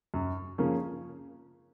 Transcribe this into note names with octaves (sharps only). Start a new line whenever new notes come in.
F#2
C#3 F3 A#3 C#4